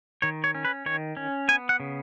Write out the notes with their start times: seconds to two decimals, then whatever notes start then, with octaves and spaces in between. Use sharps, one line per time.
0.22 D#3 C#5
0.44 C#5
0.55 C#4
0.65 B4
0.86 D#3 C#5
1.17 C#4
1.48 B3 G#5
1.69 F#5
1.80 C#3